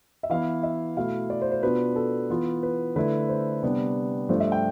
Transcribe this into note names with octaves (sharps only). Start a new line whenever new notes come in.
E5
E3 B3 E4 F5
E5
B2 A3 E4 F5
D5
C5
C5
B2 B3 D4 F4 B4
A4
E3 B3 F4
B4
D3 A3 E4 B4
C5
C3 G3 B3 D4
G2 F3 A3 D4 F4 C5
E5
G5